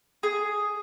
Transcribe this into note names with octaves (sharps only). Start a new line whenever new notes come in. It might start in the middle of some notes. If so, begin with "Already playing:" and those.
G#4